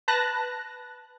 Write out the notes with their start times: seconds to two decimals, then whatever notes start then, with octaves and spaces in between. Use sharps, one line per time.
0.08 B4 A5 F#6 A#6